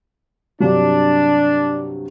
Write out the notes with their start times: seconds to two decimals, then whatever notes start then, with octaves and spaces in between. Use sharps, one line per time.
0.60 G2 C3 F#3 D4